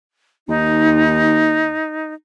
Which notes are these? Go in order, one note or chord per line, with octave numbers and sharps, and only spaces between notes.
D#2 D#4